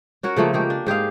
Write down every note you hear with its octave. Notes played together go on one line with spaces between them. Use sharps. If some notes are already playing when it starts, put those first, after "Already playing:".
C#4 F#4 A#4 C#5
C#3 F3 A3 A#3
G#3 A#3 G4
D4
G#2 G4 G#4 F5